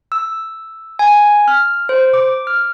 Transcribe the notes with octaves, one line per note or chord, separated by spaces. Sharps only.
E6
G#5
F6
C5
D6
F6